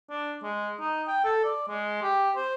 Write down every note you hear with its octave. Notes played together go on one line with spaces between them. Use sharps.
D4
G#3
D#4
G5
A4
D5
G#3
G4
C5